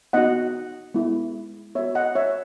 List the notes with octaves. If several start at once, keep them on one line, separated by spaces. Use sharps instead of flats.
B3 D#4 F#4 D#5 F#5
G#3 B3 E4
B3 F#4 C#5 E5
D#5 F#5
C#5 E5